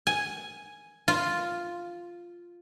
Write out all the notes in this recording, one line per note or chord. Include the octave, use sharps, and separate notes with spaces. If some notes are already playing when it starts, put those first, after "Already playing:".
G#5
F4